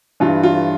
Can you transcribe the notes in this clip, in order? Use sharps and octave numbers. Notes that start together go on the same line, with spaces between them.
G2 E3 F4
F4